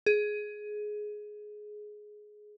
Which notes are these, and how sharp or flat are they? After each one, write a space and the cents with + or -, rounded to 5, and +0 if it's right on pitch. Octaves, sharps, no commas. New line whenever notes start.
G#4 +15